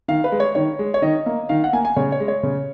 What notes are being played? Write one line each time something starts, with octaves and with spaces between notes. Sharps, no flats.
D#3 F5
B4
G#3
C#5
D#3 C#5
G#3
C#5
D#3 D#5
A#3
D#3 F5
F#5
A#3 G#5
G#5
C#3 C#5
C#5
G#3
C#5
C#3